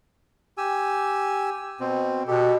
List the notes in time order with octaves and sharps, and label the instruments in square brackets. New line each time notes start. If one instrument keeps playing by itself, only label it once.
[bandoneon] G4 G#5 E6
B2 C4
[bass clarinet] B2 [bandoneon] G4 A4